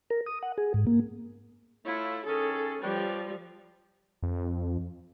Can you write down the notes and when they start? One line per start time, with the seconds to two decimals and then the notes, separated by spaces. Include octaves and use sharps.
0.10 A#4
0.26 D#6
0.42 F#5
0.58 G#4
0.74 G#2
0.87 A#3
1.86 A3 E4 F4 C#5
2.26 D#3 C#4 G#4 A4
2.82 F3 G3 G4 B4 C#5
4.23 F2